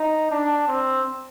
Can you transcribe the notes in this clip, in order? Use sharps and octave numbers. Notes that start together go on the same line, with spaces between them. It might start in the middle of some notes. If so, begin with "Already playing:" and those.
Already playing: D#4
D4
C4